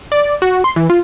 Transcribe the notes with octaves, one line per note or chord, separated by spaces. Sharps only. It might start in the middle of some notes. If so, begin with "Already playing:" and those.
D5
F#4
C6
E3
F4